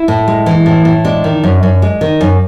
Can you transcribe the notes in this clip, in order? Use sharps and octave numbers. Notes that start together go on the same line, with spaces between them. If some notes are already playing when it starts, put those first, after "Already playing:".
Already playing: E4
A2
G#3
E3
A2
A2
G#3 D4
D#3
F#2
F#2
G#3
D#3
F#2